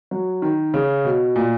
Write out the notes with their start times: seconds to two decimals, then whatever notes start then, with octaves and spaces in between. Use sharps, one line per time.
0.11 F#3
0.42 D#3
0.74 C#3
1.05 B2
1.36 A#2